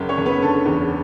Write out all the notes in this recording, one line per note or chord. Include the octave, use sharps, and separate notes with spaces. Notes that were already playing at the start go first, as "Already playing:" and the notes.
Already playing: F#1 F#2
C#4 C#5
F#1
B3 B4
D3 A4
E2